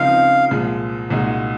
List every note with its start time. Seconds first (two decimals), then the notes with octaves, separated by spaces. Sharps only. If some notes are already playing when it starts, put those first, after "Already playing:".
Already playing: C#2 C#3 F3 C4 D#4 F5
0.51 C2 A#2 F3 G#3
1.10 C2 A#2 G#3 D#4 F#4